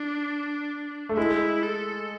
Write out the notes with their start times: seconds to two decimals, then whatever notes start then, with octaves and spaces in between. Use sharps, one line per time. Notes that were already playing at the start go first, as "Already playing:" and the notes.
Already playing: D4
1.09 A3
1.17 G#3 E4
1.63 A4